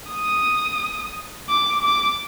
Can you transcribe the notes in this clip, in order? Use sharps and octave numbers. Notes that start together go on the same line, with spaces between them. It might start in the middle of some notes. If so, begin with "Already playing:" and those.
D#6
D6
D6